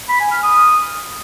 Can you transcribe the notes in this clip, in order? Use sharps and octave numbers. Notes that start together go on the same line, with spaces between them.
B5
G#5
F6
D#6